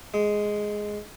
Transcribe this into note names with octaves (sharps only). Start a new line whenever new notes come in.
G#3